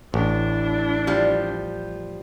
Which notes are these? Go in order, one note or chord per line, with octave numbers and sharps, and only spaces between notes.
A1 D4 E4
F3 G3